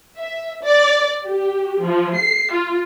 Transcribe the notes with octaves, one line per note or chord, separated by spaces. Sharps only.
E5
D5
G4
F3
C7
F4